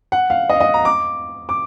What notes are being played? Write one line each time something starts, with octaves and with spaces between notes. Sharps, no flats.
F#5
F5
D#5
F5
D#5
A#5
D6
D6